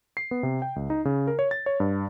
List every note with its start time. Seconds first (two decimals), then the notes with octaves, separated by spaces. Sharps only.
0.17 C7
0.31 B3
0.43 C3
0.62 G5
0.76 C#2
0.90 D#4
1.05 C#3
1.27 A#4
1.39 C#5
1.51 A6
1.66 C#5
1.80 G2